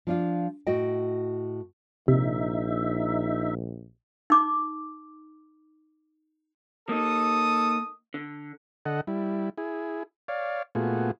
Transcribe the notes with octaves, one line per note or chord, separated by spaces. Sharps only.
F3 D4 F4
A2 F#4 D#5 G5
A#1 C3 D#4 E5
D#4 D6
A#3 D#4 A4 D#6
D3
D3 A4 D#5 F#5
G3 E4
E4 G#4
C#5 D5 F5
A#2 A3 B3 F4 F#4 G#4